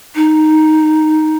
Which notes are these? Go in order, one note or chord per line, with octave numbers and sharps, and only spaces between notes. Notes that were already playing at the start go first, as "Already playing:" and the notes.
D#4